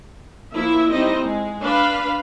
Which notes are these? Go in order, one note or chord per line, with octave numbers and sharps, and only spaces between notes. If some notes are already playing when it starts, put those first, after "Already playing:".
F3 A#3 E4 E5
G3 C4 D#4 E4 C5 D#5
G#3
D4 B4 F5 B5